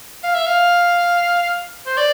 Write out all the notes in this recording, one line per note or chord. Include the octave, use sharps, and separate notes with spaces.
F5
E5
F5
C5
D5